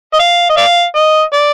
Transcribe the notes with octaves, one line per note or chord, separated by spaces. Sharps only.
D#5
F5
D#5
D5 F5
D#5
D5